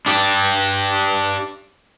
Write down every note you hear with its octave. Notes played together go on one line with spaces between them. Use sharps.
D4 G4